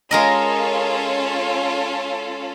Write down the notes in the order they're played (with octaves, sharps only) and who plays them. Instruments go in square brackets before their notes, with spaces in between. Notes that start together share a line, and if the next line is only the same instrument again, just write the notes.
[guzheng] G#3 A#4 D#5 [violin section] C#4 F4 A4